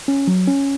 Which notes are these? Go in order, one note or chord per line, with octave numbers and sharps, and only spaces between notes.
C#4
F#3
C#4